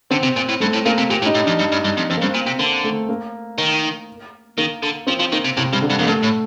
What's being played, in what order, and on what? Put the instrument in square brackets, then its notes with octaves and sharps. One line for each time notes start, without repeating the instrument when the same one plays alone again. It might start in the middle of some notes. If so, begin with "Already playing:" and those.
[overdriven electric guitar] D3 [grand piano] C4
[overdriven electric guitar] C3
A#2
A2
[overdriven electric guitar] G2 [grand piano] A3
[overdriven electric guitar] A2
[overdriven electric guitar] A#2 [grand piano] A#3
[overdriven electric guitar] C3
[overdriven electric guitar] A#2 [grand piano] G4
[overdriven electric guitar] A2
[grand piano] D#4
[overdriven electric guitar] A2
[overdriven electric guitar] F2 [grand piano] D4
[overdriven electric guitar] G2
G2
G2
F2
[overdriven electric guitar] F2 [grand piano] C4
[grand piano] A#3
[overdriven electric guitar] G2 [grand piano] C4
[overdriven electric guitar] A#2
C3
[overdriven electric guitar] D3 [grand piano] A#3
[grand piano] A3
A#3
[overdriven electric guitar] D#3
[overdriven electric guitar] D#3 [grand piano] A#3
[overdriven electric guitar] D3
[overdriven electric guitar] F3 [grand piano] C4
[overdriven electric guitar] F3
[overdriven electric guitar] D#3 [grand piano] A#3
[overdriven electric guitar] C3
[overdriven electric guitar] A2 [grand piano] C3
[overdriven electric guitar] G2 [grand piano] C3
[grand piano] D3
[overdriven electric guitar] G2
[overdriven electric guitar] F2 [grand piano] A#3
[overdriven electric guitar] G2 [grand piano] A3
[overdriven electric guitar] A2